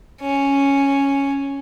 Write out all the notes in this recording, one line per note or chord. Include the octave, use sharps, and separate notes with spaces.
C#4